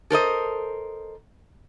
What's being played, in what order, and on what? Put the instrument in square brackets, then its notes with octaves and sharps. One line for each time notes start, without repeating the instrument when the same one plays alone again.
[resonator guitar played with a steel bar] A4 A#4 C5 D#5